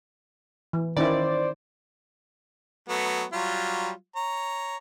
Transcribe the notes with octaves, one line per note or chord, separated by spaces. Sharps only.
E3
D#3 C#4 E4 C5 D5
F#3 A3 B3
F#3 G3 F4
C#5 A#5